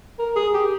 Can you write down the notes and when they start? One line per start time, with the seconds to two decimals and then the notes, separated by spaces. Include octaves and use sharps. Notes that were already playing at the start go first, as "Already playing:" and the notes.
0.19 A#4
0.36 G#4
0.54 G4